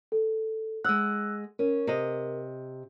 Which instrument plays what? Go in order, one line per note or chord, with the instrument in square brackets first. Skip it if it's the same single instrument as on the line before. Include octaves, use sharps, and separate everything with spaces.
[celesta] A4
[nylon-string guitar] G#3 F#5 [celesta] E6 F#6
[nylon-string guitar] C#4 [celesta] A#4
[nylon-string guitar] C3 D#5